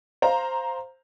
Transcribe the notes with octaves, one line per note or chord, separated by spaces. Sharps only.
C5 F5 A#5